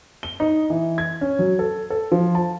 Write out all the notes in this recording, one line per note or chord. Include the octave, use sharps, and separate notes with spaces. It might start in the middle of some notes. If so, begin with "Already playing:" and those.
G7
D#4
E3
G#6
C#4
F#3
A4
A4
F3
A5